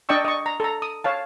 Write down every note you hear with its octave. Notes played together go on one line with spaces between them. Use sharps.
D4 D5 D#5 G5 C#6 E6
D#5 C#6
A#5
A4 A#5
D#6
C#5 F5 A5